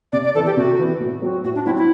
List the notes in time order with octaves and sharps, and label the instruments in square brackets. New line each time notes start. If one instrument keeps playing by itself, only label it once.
[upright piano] C3 [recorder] D5
[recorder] D5
[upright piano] E3 B3 [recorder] A4
[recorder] G4
[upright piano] C3 [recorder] F#4
[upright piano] E3 B3
A2
F#3 C4 F#4
[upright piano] A2 [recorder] F#4
[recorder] D4
[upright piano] F#3 C4 F#4 [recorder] E4
[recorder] E4